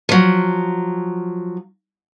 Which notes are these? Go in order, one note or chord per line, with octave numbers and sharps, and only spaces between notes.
F3 F#3